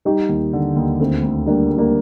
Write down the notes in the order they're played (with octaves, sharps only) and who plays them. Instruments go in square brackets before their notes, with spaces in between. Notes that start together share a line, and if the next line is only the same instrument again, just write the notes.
[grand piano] G3 [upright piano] D#4 G4
[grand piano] D#2
D3
D#2
[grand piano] D2 [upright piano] A3 C4
[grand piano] D2
[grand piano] G3 [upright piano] A#3 D4
[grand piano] G3
[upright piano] A#3 D4